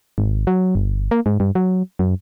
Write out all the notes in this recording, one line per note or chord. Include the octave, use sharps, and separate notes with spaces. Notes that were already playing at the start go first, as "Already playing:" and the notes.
G#1
F#3
G1
A#3
G#2
G2
F#3
F#2